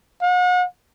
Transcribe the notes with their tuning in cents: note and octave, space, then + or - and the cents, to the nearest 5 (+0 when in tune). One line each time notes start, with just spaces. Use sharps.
F#5 -40